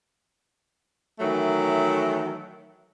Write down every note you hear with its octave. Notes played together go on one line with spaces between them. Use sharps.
D#3 E3 F#3 A3